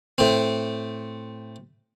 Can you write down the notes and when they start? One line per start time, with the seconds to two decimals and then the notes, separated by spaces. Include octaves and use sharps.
0.18 A2 C4